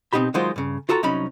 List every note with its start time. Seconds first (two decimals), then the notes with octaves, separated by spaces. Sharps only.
0.13 B2 C4 D#4 G4 B5
0.34 D#3 F#3 G#3 F4 C5 D5
0.56 G2 C#3
0.89 F4 F#4 A4 G5 A#5
1.03 C2 F#3 C#4 D#4 B5